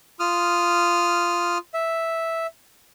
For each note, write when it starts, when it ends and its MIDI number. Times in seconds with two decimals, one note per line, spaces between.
0.20 1.58 65
0.20 1.58 87
0.20 1.58 89
1.74 2.47 76